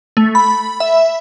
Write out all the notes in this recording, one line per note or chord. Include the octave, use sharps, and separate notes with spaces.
A3
B5
E5